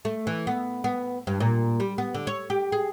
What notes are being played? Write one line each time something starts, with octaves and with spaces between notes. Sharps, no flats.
A3
E3
B3
B3
G2
A#2
G3
B3
D3
C#5
G4
G#4